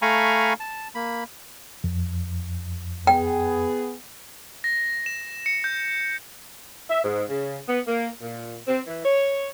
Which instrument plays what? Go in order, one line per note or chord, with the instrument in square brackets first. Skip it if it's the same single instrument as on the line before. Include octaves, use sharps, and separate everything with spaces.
[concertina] A3 F5 G#5 A#5 B5 C#6
A5
A#3 B5
[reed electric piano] F2
[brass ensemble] B3 G#4 [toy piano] G5
[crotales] A#6
E7
C#7
G6
[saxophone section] E5
G#2
C#3
B3
A#3
A#2
C4
E3
C#5